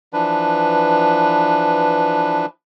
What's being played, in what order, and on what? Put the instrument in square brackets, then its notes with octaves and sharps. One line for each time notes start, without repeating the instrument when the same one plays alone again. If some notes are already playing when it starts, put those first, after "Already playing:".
[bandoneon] E3 F3 D4 B4